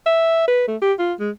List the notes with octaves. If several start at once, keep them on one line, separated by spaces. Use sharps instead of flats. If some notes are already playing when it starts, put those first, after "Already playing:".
E5
B4
A3
G4
F4
G#3